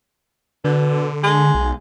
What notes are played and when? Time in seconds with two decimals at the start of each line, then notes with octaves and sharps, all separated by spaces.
0.65 B2 D3
1.24 G#3
1.55 B1